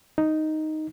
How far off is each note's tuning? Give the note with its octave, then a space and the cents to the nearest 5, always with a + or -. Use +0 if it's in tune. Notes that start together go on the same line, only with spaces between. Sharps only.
D#4 +0